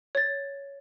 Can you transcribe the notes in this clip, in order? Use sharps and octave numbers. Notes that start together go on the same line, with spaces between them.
C#5 A6